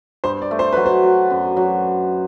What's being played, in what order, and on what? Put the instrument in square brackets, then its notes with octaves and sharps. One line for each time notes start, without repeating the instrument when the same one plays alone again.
[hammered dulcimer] G2 [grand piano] C5
[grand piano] D5
[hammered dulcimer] A3
[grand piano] C5
[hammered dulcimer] F#3 [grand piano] B4
[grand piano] C5
[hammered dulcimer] F#3
F#2
F#3